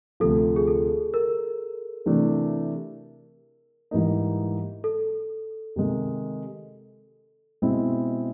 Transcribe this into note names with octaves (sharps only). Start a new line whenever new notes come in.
D2 C3 F3 A4
G#4
A4
A#4
C3 E3 A3 D4
G#2 E3 G3 A#3 D#4
A4
C3 D#3 G#3
B2 G#3 C4 E4